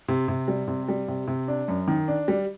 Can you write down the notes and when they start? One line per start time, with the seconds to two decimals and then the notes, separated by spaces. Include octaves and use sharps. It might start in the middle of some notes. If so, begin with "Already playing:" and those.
0.08 C3
0.28 C3
0.48 G3
0.68 C3
0.89 G3
1.08 C3
1.27 C3
1.48 D4
1.68 F#2
1.88 D#3
2.08 D4
2.28 G3